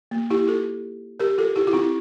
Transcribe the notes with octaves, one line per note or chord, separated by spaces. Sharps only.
A#3
E4 G4
F4 A4
G4 A#4
F4 A4
E4 G4
F4
C4 E4